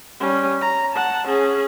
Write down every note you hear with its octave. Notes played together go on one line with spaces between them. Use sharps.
G3 C#4
A#5
F#5 A5
C#4 G#4